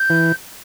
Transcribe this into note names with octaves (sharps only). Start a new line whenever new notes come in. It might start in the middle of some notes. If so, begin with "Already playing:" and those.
Already playing: G6
E3